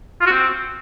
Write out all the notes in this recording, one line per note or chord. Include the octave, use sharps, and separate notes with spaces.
F4
F#4
C4